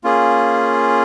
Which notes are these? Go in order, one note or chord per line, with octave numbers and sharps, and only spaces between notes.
A#3 C#4 F4 G#4